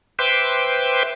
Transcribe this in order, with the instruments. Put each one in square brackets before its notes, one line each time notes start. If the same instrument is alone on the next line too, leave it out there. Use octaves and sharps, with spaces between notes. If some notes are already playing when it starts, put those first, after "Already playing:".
[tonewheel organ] B4 C5 E5 G5 C6 D6